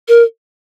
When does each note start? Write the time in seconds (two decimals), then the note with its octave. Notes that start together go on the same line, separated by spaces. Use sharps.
0.08 A#4